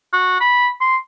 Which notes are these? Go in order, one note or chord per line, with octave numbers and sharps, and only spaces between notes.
F#4
B5
C6